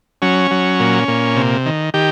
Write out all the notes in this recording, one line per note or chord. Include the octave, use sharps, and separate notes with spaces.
F#3 C#4
F#3
A#2
A#2
C3
D#3
D#3 G4